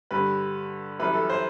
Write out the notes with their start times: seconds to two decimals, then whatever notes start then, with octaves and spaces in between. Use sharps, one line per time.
0.11 G2 D3 G3 B4
0.99 F#2 E3 G3 B4
1.14 A4
1.29 C5